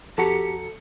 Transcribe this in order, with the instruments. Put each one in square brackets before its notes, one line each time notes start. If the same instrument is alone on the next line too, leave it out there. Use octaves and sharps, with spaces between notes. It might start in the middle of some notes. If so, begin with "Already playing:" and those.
[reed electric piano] F2 F#4 A#5 [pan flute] G4 [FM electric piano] A4 C#7